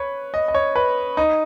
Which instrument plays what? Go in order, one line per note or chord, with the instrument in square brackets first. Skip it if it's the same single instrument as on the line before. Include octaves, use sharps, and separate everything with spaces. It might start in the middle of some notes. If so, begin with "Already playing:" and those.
Already playing: [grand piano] B4 C#5
D#5
D#5
C#5
B4
D#4